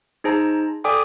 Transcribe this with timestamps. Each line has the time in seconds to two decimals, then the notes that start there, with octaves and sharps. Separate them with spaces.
0.24 D#4 G#4 C5 A5 A#5
0.84 A4 D5 G5 G#5 D6 D#6